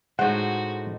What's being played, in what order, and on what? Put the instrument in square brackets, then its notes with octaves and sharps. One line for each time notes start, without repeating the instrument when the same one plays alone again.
[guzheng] A2 C5 [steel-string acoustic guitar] G#3 D#4 [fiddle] F#4 [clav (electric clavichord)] F#5